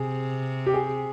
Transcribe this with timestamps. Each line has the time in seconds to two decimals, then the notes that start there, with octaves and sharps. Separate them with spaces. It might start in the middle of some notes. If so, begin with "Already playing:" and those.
Already playing: C3 G#4
0.66 G4
0.74 G#4